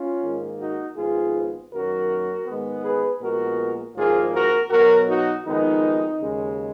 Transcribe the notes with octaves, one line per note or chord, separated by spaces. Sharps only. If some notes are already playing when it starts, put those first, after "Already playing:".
Already playing: C#4 F4
G#2 D#3 A#3
D#4 F#4
G#1 G#2 F3 B3 F4 G#4
F#2 D#3 F#3 A#3 F#4 A#4
G#2 D#3 G#3 B3
G#4 B4
A#1 A#2 G#3 B3 F#4 A#4
G#1 G#2 F3 A#3 F4 G#4
F#4 A#4
B1 B2 F#3 F#4 A#4
D#4 F#4
F2 D#3 G#3 B3 D#4
D#2 C#3 G#3